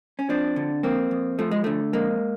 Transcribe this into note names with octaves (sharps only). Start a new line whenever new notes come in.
C#4
F3 C4 D4
D3
F2 A#3 C4
F2
F3 A3
G#3
D3 A3
F2 G#3 A#3